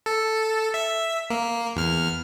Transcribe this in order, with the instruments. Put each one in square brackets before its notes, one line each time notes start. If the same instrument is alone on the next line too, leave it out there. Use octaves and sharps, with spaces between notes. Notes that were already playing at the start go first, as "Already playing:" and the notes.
[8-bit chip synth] A4
E5
A#3
E2 F6